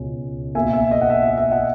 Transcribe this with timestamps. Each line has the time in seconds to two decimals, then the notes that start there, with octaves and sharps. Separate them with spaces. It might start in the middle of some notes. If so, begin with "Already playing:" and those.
Already playing: C#2 B2 G#3 C#4
0.55 B1 B2 A#3 E5 G#5
0.73 E5
0.91 D#5
1.01 F#5
1.10 E5
1.23 D#5
1.38 E5
1.51 D#5 F#5